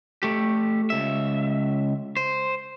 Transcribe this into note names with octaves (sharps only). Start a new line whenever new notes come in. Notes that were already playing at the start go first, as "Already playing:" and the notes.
A3 G4
C#2 E5
C5